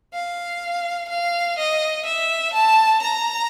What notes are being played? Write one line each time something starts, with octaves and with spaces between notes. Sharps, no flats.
F5
F5
D#5
E5
A5
A#5